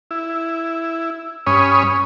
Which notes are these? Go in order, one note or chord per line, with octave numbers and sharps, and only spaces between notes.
E4
G2 C#4 C#5 G#5 B5 D#6